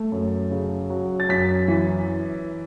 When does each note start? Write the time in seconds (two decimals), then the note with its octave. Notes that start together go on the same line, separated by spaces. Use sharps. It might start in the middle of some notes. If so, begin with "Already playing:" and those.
Already playing: A3
0.12 F#2
0.51 C#3
0.90 F#3
1.20 A6
1.29 F#2 B6
1.68 E3